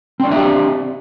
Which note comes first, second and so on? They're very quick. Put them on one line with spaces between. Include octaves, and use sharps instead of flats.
C4 D5 D4 E5 G4